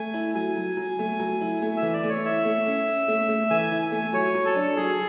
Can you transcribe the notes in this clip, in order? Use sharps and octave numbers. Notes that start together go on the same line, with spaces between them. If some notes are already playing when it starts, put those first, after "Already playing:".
Already playing: A3 G#5
E4
F#3 G#5
F#3
F#3
A3
F#3
E4
A3 G#5
E5
E3
D5
A3
C#5
E4 E5
A3
C#4
C#4
A3
A3
E3 G#5
E4
G#5
A3
F#3 C#5
F#3
A4
D4
F#3 G#4